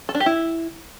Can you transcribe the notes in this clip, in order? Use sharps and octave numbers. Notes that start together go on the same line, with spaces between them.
A4
D4
G4
E4